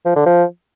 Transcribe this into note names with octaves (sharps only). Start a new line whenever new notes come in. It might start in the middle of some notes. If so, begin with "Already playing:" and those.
F3
D3
F3